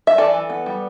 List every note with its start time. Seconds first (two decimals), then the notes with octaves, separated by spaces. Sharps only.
0.07 E5
0.18 E3 A4 D5
0.34 E3
0.50 B3
0.66 G3